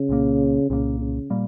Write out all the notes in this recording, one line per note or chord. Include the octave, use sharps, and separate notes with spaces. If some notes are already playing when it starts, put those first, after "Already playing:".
Already playing: C#3
C2 A#2 G3 A#3
C2 A#2 C#3 G3 A#3
C#3
A#2 G3 A#3